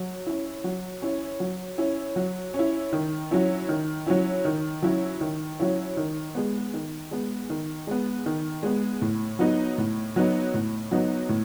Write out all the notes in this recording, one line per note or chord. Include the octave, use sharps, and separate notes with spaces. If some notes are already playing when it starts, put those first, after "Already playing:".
Already playing: F#3
C#4 E4
F#3
C#4 E4
F#3
C#4 E4
F#3
C#4
E4
D#3
F#3 C#4 E4
D#3
F#3 C#4 E4
D#3
F#3 C#4 E4
D#3
F#3 C#4 E4
D#3
G#3 B3
D#3
G#3 B3
D#3
G#3 B3
D#3
G#3 B3
A2
F#3 B3 D#4
A2
F#3 B3 D#4
A2
F#3 B3 D#4
A2